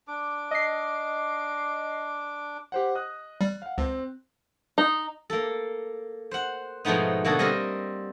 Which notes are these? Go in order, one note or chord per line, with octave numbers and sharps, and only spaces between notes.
D4 D6
D#5 C7
G4 C5 F#5
D#5 D#6 F#6
G3
F5 F#5
C#2 C4
D#4
A#3 A4
C5 F#5
G#2 B2 F3 A3 B3 D#4
B2 D3 A#3 F#4 G#4 A4
G3 C4 A#4 D#5